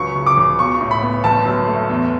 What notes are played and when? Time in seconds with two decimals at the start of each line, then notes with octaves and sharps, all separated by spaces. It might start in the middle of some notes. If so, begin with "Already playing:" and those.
Already playing: C#2 F#3 C#6
0.16 C#3
0.26 D6
0.37 C#2
0.59 B1 C#6
0.80 A2
0.91 B5
1.02 B3
1.24 G1 A5
1.45 F#2
1.67 A3
1.90 E2